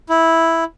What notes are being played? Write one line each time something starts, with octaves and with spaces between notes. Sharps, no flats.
E4